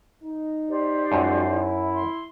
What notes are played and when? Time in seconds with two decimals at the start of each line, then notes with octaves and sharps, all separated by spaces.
0.23 D#4
0.68 G4 C5 D5
1.12 F#2 F3 G#3 F#4
1.51 E4
1.94 C6